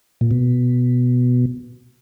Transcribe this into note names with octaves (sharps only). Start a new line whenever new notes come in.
A#2
B2